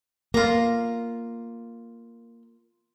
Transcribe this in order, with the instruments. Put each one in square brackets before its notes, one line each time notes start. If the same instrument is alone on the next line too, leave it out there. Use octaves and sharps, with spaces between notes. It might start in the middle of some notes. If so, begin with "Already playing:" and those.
[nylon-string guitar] A#3 [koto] F4 A#5